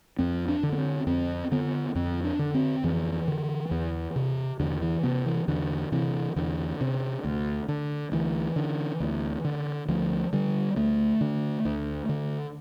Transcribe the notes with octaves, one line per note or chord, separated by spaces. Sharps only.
F2 C4
D4
D3
B3
C4
F2 C4
D3 B3
F2 C4
D4
D3
C4
F2 E3
D3
E2
C3
E2 D3
E3
C3 B3
E3
E2 D3
C3 E3
E2 D3
C3
D2
D3
D2 E3
D3
D2
D3
D2 F3
D3 G3
D2 A3
D3
D2
D3